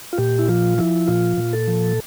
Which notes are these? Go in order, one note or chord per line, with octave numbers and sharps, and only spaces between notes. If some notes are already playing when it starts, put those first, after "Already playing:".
F4
A#2 G4
E4
F3 F4
F3 E4
A#2 F4
A#2
A4
F3